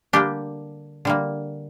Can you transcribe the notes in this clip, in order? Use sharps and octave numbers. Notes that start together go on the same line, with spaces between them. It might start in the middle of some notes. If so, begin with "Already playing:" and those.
D3 G3 A#3 D4 G4
D3 G3 A#3